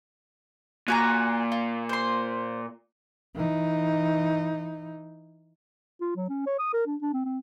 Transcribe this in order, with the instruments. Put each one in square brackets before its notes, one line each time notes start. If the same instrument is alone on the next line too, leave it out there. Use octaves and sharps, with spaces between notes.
[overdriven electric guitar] A#2 [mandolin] F#4 G#5 A#5
[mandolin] F4
C5 C6
[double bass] E3 D#4
[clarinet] F4
F#3
C#4
C#5
D#6
A#4
D4
D4
C4
C4